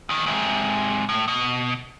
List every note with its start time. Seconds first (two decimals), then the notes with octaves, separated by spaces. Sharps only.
0.09 E2 D#3
0.26 G#2 C3
1.09 A2
1.28 B2